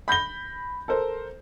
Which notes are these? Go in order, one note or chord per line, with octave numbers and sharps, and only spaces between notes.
B5 G6 A#6 G7
A4 A#4 C5